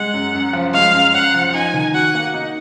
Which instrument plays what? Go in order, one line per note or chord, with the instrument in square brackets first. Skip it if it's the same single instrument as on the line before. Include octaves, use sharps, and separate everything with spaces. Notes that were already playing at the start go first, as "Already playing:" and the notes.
Already playing: [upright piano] G#3 [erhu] F#5
[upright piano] F#2
F#2
F3
[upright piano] G#3 [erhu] F5
[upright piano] F#2
[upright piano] F#2 [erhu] F#5
[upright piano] F3
[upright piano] D#4 [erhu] G#5
[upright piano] D#3
[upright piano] F#4 [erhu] F#5
[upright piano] A#3
D#4